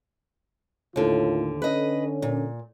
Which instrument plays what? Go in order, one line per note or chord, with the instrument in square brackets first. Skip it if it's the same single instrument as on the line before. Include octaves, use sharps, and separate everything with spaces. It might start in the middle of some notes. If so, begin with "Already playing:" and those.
[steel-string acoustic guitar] D#2 D3 [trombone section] A2 D#3 F4
[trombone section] D3 C#4 [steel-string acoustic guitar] B4 D#5
[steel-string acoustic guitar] A#2